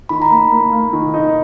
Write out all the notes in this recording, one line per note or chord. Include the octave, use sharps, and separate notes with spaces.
D#3 B5
A#5
A#3 B5
A#3
A#3
D#3
D#4